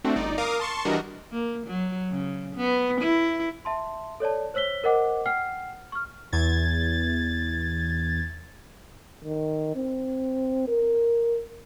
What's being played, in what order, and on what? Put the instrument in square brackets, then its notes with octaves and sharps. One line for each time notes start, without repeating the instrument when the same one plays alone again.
[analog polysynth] A3 C4 D4 F#4
G1 D#4 D5
A#4 F5 D6 D#6
A5 C6 C#6
E3 G3 D4 F#4 A#4 D#5
[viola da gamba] A#3
F#3
C#3
B3
E4
[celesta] E5 A5 C6
A4 C#5 D5 A5
C5 C#5 E6 B6 G7
A#4 C5 D#5 F#5 D6
F#5 G5 F6 C7
C#6 F6
[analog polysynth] E2 G#6 A6
[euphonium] D#3
C4
A#4